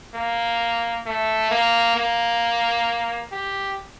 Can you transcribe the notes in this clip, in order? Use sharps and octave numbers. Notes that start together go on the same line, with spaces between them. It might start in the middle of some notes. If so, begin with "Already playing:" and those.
A#3
A3
A#3
A#3
G4